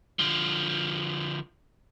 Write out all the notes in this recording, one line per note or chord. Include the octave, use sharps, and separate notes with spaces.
D3 F3